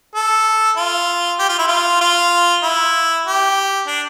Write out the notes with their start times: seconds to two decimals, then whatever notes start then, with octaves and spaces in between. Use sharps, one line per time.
0.15 A4
0.77 F4
1.39 G4
1.49 F4
1.59 E4
1.68 F4
2.01 F4
2.63 E4
3.26 G4
3.87 D4